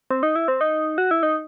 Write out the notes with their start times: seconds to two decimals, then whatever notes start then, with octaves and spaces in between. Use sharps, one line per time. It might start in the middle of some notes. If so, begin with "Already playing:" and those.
0.11 C4
0.23 D#4
0.36 E4
0.48 C4
0.61 D#4
0.98 F#4
1.11 E4
1.23 D#4